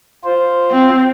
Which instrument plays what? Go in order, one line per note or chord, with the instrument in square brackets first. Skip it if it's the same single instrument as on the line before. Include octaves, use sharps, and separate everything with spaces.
[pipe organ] F4 C5
[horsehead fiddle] C4